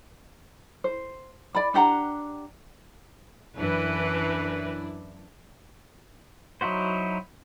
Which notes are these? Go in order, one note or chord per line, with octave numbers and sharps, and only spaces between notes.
C5
D5 B5
D4 G4 F#5 A#5
F#2 E3 D4 E4 B4
F#3 D#4 E4 F#4 C5